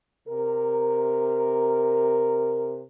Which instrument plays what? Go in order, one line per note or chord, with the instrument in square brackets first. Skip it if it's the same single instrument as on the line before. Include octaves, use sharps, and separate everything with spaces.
[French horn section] C3 A#4